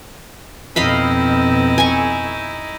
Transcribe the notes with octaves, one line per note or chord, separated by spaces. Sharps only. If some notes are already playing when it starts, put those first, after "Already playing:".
F2 B2 C4 D#4 E4 D#5 F5 B5
G#5 C#6